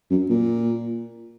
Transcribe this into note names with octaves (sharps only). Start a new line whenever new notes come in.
F#2
A#2